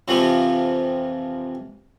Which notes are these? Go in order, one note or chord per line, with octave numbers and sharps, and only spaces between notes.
F2 C3 E3 F3